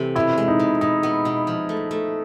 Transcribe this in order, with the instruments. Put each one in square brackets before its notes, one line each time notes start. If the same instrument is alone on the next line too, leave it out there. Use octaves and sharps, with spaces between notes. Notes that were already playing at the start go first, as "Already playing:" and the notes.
Already playing: [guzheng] C3 E3 A3
[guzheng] B2 [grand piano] E4
[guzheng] G#3
[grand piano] D#4
[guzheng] B2
[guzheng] B2 [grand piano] D#4
[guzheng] B3
B2
F3
A3
A3